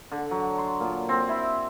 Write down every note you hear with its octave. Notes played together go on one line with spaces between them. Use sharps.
D3
F#3
C6
A#2
C4
E4